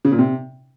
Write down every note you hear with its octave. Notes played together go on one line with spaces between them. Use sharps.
C#3
A#2
C3